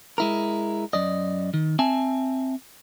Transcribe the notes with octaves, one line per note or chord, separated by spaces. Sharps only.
G#3 E4 A#4
F#2 D5 D#5
D#3
C4 E5 G#5 A5